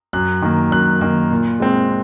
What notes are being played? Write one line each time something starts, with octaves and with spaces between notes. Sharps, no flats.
F#2 F#6
D#3 A#3
F#2 F#6
D#3 A#3
A#2
G#3 C4